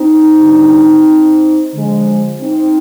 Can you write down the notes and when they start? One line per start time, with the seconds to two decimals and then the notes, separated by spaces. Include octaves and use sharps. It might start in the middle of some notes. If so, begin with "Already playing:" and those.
Already playing: C4 D#4
0.37 D3 G3
1.73 D3 F3 G#3
2.41 C4 D#4